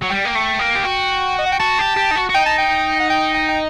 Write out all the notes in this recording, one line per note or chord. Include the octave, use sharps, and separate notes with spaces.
F#3 F#5
G3 G5
A#3
A3
A#3
G4
F#4 G5
D#5
F#5
G5
F#4 A5
G4
G4
D#4
F#4
F#4
D#4 G5
A5
G5
F#5
G5
G5
G5